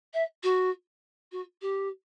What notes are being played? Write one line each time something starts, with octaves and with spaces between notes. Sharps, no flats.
E5
F#4
F#4
G4